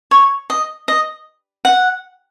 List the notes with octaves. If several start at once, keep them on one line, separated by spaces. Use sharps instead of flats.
C#5
D#5
D#5
F#5